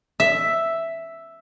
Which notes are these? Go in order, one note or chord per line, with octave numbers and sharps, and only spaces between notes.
E5